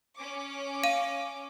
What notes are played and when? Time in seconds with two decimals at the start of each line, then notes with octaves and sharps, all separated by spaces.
0.19 C#4 D6
0.83 F5 D#7